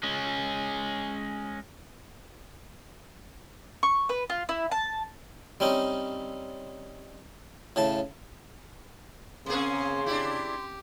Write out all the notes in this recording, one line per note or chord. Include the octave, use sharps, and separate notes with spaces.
G#3 C#4
C#6
B4
F4
E4
A5
G3 C4 C#4 D#4
A2 C#3 A5
C#3 A#3 C4 C#4 G#4 C6
D4 E4 G4